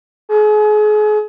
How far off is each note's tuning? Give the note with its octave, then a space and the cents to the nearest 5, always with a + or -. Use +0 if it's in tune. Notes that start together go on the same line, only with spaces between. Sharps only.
G#4 +35